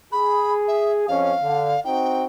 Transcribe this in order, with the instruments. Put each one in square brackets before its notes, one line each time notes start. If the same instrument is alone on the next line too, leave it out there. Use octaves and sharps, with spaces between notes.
[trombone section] G#4 [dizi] B5
[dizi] E5
[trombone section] F2 C#4 [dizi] F5
[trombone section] D3
[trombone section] C4 D#4 F#4 [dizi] G5